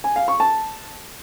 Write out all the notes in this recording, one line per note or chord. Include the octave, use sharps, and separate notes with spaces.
G#5
F5
C#6
A5